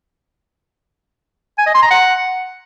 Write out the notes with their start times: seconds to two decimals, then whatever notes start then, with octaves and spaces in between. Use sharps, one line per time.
1.58 G#5
1.66 D#5
1.74 C6
1.83 A#5
1.91 F#5